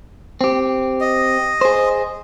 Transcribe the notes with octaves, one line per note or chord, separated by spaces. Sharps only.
C4 G4
D#5
G#4 C5